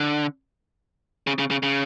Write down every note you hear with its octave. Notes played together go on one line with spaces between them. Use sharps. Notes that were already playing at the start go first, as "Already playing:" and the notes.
Already playing: D3
C#3
C#3
C#3
C#3